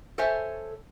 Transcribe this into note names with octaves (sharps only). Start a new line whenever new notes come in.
A4 C5 C#5 E5 G#5 A5